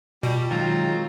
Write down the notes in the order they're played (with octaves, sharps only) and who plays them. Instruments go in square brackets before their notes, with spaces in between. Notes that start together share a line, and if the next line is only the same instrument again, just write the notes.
[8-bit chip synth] B2 [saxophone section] G3 [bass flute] F4
[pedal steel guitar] D#3 F#3 [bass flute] G#3 [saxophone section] C4 D#4 F4